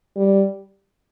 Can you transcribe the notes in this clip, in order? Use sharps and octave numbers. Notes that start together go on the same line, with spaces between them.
G3